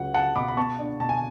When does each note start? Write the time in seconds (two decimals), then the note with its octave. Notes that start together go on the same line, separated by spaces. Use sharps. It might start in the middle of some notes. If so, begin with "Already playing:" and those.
Already playing: C#2 F#3 F#5
0.14 C#2 F#5 A5
0.36 B2 B5 D6
0.48 B5
0.57 B3 A5 C#6
0.79 D4
1.00 B2 A5
1.09 G#5